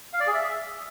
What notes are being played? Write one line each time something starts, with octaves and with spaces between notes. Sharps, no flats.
F5
D5
G#4
E5